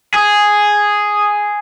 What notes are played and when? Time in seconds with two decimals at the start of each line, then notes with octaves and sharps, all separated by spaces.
0.14 G#4